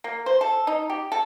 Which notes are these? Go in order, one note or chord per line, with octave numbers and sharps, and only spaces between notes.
A#3
C5
A4
D#4
G4
A4